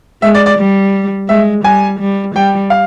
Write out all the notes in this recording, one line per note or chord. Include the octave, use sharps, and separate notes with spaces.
G#3 E5
D5
D5
G3
G#3 E5
G3 G#5
G3
G3 G5
F5